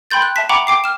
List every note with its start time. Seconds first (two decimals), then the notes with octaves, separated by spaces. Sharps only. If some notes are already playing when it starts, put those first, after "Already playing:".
0.11 G5 B5 C6 G6 A6
0.22 F#6
0.36 E5 A5 B6
0.49 F#5 G5 A#5 B5 C#6 D6
0.67 G5 D6 C7
0.84 F6 E7